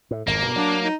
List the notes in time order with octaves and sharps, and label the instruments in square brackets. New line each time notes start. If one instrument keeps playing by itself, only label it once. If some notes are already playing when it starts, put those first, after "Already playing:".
[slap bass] A2
[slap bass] G#1 F2 [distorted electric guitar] A#3
[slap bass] G2 B2
[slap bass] F#3 [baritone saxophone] D4
[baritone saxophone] D#4